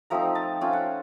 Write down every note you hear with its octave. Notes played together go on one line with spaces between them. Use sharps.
F3 A3 C4 D#4 A#5
A5
A3 C#4 F4 G5
F#5